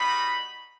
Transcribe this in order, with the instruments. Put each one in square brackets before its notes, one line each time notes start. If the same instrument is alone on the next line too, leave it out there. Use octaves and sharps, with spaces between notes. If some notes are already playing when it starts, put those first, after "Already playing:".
Already playing: [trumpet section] G3 B3 D#4 F#4 B5